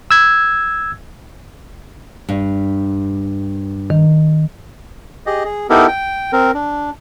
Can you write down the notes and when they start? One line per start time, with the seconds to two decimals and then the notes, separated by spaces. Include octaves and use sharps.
0.11 E6 G#6
2.29 G2
3.90 D#3
5.26 G4 G#4 D#5
5.45 G#4
5.70 B3 D#4 E4 G4 A4 A#4
5.88 G5
6.32 C4 A#4
6.55 D4